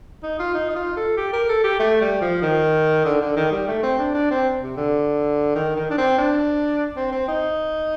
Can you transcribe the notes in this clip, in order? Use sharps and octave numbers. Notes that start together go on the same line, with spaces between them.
D#4
F4
D#4
D#4
F4
A4
G4
A#4
A4
G4
A3
G3
F3
D#3
D3
D3
D#3
G3
A3
C4
D4
D4
C4
C3
D3
D#3
D#3
D4
C4
D4
C4
C4
D#4